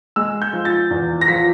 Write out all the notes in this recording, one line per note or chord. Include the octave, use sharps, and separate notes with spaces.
G#3 E6
G6
F3
A6
E2
A#6
F3 B6